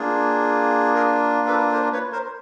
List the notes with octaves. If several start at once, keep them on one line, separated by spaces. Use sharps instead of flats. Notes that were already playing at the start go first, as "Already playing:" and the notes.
Already playing: A#3 D4 F4 G#4
G#4 A#4
A4 B4
A#4 C5
B4 C#5
A#4 C5